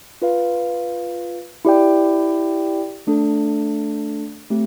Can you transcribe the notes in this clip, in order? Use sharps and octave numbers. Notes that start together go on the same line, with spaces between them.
F4 B4 F5
E4 G4 D5 G5
A3 D4 A4
A3 C4 G4